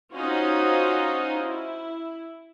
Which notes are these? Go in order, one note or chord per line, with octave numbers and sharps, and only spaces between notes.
C#4 D#4 F4 F#4 C5 D#5
E4